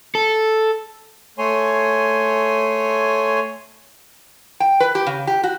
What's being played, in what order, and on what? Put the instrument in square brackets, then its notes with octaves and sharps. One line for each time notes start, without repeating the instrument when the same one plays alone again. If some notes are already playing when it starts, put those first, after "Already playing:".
[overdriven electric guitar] A4
[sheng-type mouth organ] A3 C#5 G#5 C6
[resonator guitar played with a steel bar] G5
B4
G4
C#3
G4
F#4